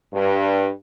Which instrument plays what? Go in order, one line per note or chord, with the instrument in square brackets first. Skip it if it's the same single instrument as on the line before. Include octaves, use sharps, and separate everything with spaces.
[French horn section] G2